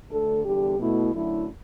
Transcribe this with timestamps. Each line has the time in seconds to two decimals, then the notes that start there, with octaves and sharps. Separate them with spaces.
0.09 D2 D3 A3 A4
0.43 E2 D3 G3 G4
0.78 B2 A3 E4
1.13 F#2 D3 F#3 A3 E4